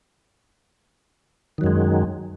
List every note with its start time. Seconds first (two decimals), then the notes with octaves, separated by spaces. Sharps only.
1.58 D#3
1.61 F#3
1.64 F#2
1.66 G#3